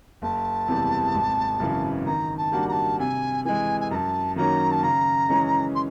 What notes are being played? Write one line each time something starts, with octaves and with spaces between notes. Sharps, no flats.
F#1 A5
E2 C3 E3 G3
G#1
F#2 C#3 E3
D#3 A#5
A5
G3 A#3 D4 F#4
A#5
A5
C3 G#5
E3 G#3 G#5
G#5
F#2 A5 A#5
D#3 F#3 A#3 C#4 A#5
A5
C#3 A#5
E3 G#3 C#4
C6